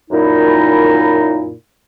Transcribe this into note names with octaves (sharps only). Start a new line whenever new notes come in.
F#2 A#2 D#4 E4